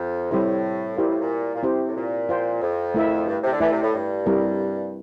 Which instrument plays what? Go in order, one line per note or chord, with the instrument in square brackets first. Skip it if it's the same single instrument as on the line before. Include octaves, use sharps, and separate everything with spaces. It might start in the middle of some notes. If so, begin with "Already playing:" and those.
Already playing: [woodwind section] F2
[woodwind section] A2 [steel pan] G3 C4 E4 G4 C5
[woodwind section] A#2 [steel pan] E4 G4 C5 F5
[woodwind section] A2
A#2
A#2
[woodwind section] C3 [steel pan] C4 E4 G4 C5
[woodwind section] A2
A#2
[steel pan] F4 C5 G5
[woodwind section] F2
[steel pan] A3 E4 A#4 E5
[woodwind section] G2
C3
D3
[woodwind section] E3 [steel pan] A3 E4 A4 D5
[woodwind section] C3
A2
G2
[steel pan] G3 C4 E4 A#4